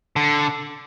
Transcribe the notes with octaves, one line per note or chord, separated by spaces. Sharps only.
D3